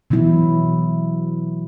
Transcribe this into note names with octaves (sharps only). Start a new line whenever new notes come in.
B2 E3 F#3 E4